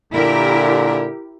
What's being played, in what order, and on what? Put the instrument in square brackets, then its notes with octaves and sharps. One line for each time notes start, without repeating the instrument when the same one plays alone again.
[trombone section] A#2 D3 [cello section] E4 G4 A#4